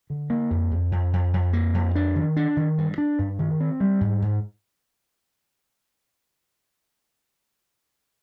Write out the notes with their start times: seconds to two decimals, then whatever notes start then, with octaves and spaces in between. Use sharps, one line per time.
0.10 D3
0.30 A#3
0.50 F2
0.71 F2
0.92 F2
1.13 F2
1.33 F2
1.53 A#3
1.74 F2
1.95 D4
2.16 D#3
2.36 D4
2.57 D#3
2.78 G2
2.98 D4
3.19 G2
3.39 D#3
3.60 C4
3.80 G3
4.01 G#2
4.22 G#2